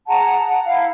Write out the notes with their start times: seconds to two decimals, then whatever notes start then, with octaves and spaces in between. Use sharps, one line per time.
0.08 G#4 F#5 A5 A#5
0.48 F#5
0.65 E4 F5